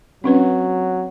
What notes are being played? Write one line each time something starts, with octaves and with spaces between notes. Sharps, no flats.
F#3 C4 C#4 B4